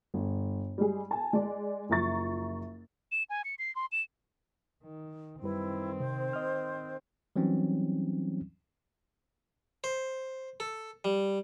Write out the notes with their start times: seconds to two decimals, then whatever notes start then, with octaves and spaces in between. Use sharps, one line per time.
0.14 G1
0.78 G3 G#3 G#4
1.11 G#5 A5
1.33 G#3 D5
1.90 F#1 F3 E5 A#5 C#6 A6
3.12 E7
3.30 G#5
3.44 C#7
3.59 C7
3.75 C6
3.92 E7
4.84 D#3
5.42 F#2 D#3 G3 C4 E4 B4
6.00 C3 C5
6.33 D#5 F6
7.36 E3 F#3 G3 C4 C#4 D#4
9.84 C5
10.60 A4
11.05 G3